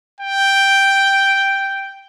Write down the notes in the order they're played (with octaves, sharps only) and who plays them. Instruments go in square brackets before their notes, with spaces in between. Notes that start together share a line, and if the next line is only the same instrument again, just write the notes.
[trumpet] G5